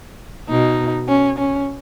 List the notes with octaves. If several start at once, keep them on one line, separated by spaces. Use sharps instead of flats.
B2 D#4
C#4
C#4